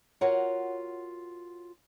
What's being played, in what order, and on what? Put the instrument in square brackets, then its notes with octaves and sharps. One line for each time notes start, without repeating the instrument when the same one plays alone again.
[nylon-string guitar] F4 F#4 A#4 C#5 F#5